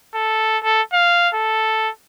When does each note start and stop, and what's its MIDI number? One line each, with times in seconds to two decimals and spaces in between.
0.15 0.58 69
0.63 0.82 69
0.93 1.29 77
1.34 1.90 69